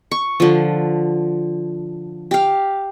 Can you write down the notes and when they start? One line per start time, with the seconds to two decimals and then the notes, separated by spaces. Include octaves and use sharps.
0.11 C#6
0.40 D3 F3
2.31 G4 F5